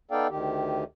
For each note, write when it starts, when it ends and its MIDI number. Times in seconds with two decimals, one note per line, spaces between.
0.11 0.27 59
0.11 0.27 63
0.11 0.27 69
0.11 0.27 74
0.11 0.27 77
0.11 0.27 79
0.29 0.84 38
0.29 0.84 51
0.29 0.84 67